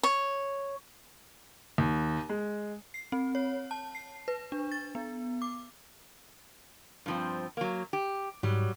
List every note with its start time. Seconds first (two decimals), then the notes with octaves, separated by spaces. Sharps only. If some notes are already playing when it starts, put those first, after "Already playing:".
0.03 C#5
1.78 D#2
2.29 G#3
2.94 C7
3.12 C4
3.35 C#5
3.71 A5
3.95 C7
4.28 B4
4.52 D4
4.72 A6
4.95 B3
5.42 D6
7.06 G2 F3 C4
7.57 F#3 A#3
7.93 G4
8.43 G#2 F#3 G3